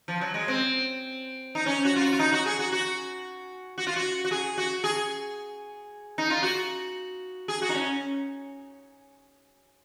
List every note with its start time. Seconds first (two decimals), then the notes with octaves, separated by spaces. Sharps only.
0.08 F3
0.21 F#3
0.34 G#3
0.48 C4
1.55 D#4
1.66 C#4
1.85 F#4
1.96 F4
2.01 F#4
2.13 F4
2.19 D#4
2.33 F#4
2.46 G#4
2.59 F#4
2.72 F#4
3.78 F#4
3.87 F4
3.96 F#4
4.25 F#4
4.31 G#4
4.58 F#4
4.84 G#4
6.18 D#4
6.30 F4
6.43 F#4
7.48 G#4
7.62 F#4
7.69 D#4
7.74 C#4